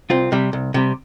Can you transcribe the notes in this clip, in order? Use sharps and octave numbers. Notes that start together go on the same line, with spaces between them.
C2 C4 F4
C3 G3
C2
C3 G3